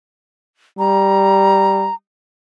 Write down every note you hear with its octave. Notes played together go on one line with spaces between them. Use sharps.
G3 A#5